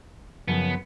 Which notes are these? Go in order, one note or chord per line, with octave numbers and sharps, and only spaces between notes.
F#2 C#3 F3 B3